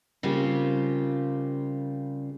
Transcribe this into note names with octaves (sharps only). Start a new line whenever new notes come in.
C#3 G3 A#3 C4 F4 G4